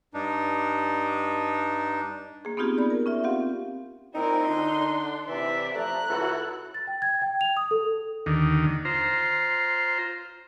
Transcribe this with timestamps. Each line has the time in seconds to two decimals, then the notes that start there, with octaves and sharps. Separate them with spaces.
0.14 G2 D4 D#4
2.45 A#3 G#4
2.57 B3 C4 D#4 F4 G4 G#4
2.78 D5 B5
2.90 A#4
3.06 C#4 F4 E5
3.24 C4 G4 F5 F#5
4.14 A#2 C4 D#4 E4 A#4
4.48 D3 D4 C6
5.26 C3 E3 D5 E5
5.75 F3 A3 A#5 F#6
6.09 C#2 E4 F#4 A4
6.74 A6
6.87 G5
7.02 G#6
7.22 G5
7.41 F7
7.57 D#6
7.71 A4
8.26 D#2 D3 D#3
8.85 F4 C5 A#5